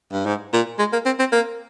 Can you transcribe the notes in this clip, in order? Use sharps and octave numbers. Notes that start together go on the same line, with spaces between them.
G2
G#2
A#2
G#3
A#3
C4
C4
A#3